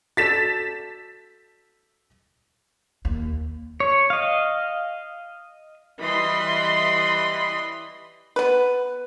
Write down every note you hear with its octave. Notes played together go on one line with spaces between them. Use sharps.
F#4 A4 D5 A6 B6 E7
D#2
C#5
D#5 F5
E3 G3 D#5 B5 C6
B3 B4